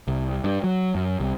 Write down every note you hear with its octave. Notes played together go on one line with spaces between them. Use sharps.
C2
G2
F#3
F#2
C2